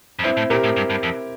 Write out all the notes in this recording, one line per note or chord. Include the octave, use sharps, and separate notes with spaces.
F2
G2 C4 E4
A2
A#2 G4 A#4
A2
G2
G2
F2